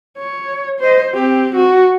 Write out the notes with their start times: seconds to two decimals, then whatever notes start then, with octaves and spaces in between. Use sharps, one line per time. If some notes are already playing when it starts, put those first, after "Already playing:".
0.18 C#5
0.80 C5 D#5
1.14 C4 G4
1.55 F#4